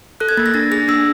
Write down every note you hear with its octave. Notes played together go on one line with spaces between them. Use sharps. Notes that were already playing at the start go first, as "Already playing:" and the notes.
A4 F#6
G#6
A#3 A6
A#6
D4 A6
G#4 A#6
D4 E6